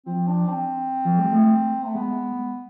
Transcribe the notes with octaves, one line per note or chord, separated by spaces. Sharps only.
F3 C4
D4
C4
F3
G#3
A3
A3
G#3 B3